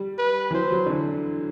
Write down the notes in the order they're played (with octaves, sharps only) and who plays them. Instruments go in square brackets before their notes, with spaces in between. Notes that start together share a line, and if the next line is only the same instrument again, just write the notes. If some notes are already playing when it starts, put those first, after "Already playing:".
Already playing: [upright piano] G3
[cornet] B4
[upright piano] E3
[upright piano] F#3 [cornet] C5
[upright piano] F#3
D3
E3